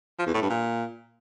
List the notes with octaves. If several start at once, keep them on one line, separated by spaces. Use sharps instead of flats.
F3
E2
A2
G2
A#2